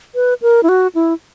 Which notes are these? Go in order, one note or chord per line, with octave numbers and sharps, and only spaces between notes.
B4
A#4
E4
F#4
E4